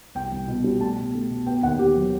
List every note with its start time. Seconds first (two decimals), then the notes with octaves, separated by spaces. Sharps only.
0.15 C2 G5
0.32 C2
0.48 B2
0.64 G3
0.81 A3 A5
0.97 B2
1.14 A3
1.30 B2
1.46 B3 G5
1.63 D#2 F#5
1.79 D#3 G4
1.97 F#3